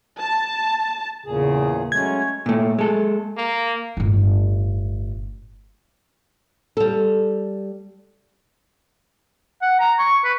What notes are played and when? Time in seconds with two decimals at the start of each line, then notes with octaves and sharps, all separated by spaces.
0.19 A5
1.26 E2 A#2 C#3 G#4
1.92 F#3 G#3 A3 C#4 G#6
2.46 A#2 A3
2.79 G#3 A4
3.38 A#3
3.97 G1 A2
6.77 G3 A4
9.62 F#5
9.80 A#5
9.99 C#6
10.24 B4